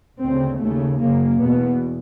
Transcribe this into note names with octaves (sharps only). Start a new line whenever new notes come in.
D2 C#3 C4
D#2 C#3 A3
F#2 C#3 A#3
E2 B2 B3